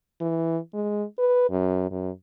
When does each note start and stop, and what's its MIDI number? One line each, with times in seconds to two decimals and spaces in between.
0.21 0.58 52
0.74 1.03 56
1.18 1.46 71
1.50 1.86 42
1.91 2.10 42